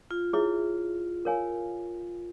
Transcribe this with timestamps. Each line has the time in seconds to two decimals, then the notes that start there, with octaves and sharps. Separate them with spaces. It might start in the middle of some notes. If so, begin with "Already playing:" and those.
0.11 F4
0.33 E4 F4 G#4 C#5 E5
1.25 A#4 C#5 F5 G#5